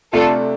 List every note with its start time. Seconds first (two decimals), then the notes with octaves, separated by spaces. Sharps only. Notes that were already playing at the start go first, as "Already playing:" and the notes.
0.13 C3 A3 D4 F4 A4